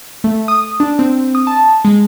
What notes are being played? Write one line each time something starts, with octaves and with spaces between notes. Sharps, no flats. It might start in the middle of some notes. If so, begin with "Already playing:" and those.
A3
D#6
D4
C4
D#6
A5
G#3